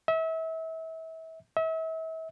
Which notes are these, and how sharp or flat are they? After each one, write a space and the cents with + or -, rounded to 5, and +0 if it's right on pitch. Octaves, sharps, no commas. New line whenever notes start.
E5 -30
E5 -35